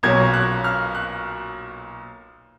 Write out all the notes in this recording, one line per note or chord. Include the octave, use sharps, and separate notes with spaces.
B1 A#2 F#3 A#3 C#4 G#6
F#6
F6
F#6